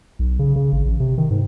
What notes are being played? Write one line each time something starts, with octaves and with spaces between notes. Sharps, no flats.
B1
C#3
C#3
G#1
A1
C3
D#3
G#2